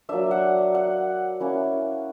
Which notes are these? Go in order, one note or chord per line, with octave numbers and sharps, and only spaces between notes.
F#3 A#3 D4 E5
F#5
F#5
A#3 C#4 E4